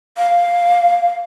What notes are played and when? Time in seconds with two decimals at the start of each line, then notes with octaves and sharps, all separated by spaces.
0.18 F5